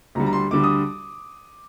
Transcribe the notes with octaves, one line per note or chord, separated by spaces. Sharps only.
D2 D3 G3 A#5
A#5
C6
D2 D3 G3 D6
D#6